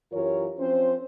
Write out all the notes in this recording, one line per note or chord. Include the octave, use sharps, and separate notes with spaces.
F#2 E3 F4 G4 A#4 C#5
F3 C4 C#4 C5